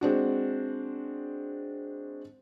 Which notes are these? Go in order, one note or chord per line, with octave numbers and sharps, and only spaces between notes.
G#3 C4 D4 F#4